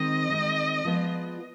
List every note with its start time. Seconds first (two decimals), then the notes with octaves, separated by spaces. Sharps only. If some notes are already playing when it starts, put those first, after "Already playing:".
Already playing: D#3 G#3 C4 D#5
0.29 D#3 G#3 C4
0.85 F3 G#3 B3 F4